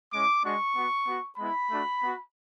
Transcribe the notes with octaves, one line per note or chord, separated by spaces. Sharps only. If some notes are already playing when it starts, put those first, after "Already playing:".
G#3 C#4 E4 D6
G#3 D4 F#4 C#6
B3 F#4
B3 F#4
G#3 B3 E4 B5
A3 D4 F#4
B3 F#4